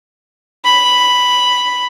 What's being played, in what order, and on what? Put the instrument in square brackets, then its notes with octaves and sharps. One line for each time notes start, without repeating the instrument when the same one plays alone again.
[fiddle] B5